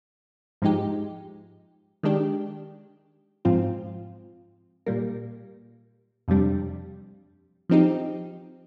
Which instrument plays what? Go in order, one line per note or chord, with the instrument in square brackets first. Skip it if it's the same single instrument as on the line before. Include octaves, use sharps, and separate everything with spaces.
[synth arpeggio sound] G#2 F3 G#3 D#4 G4
D#3 G#3 D4 G4
G#2 F3 C4 F4
A#2 G3 A#3
F2 C3 G3 D4
F3 C4 D#4 G4